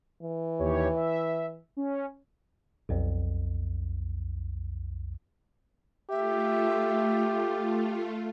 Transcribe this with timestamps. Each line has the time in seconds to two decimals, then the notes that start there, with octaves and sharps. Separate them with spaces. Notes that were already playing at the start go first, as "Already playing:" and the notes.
0.23 E3
0.59 D#2 G4 C#5
0.96 E5
1.77 C#4
2.89 B1 F2
6.10 A3 F4 G4 E5